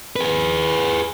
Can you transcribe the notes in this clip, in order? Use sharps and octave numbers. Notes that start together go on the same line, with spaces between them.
G#4 B4